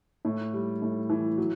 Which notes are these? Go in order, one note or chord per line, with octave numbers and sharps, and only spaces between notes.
A2
G3
A2
E3
F#3